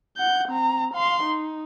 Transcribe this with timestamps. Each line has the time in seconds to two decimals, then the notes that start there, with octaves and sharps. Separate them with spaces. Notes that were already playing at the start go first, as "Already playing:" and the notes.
0.17 F#5 G6
0.49 C4 A#5
0.94 F5 C6
1.24 D#4